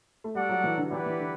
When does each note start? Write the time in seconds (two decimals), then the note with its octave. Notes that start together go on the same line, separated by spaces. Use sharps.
0.24 A3
0.35 G3 F#4 A4 D5 F#5
0.49 F#3
0.64 E3
0.78 D3
0.91 E3 E4 G4 B4 D5 F#5
1.06 E3
1.20 D3